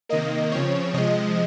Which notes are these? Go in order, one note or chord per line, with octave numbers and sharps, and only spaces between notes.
C3 D#3 A#3 D#5
C#3 F3 C4 C#5
C3 F3 G#3 D#5